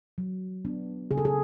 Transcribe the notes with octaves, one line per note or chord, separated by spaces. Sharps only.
F#3
B3 D4
C#3 G#4
A4
G#4